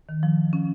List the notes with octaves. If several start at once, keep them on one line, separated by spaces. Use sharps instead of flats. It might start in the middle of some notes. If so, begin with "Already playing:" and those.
D#3
F3
C#4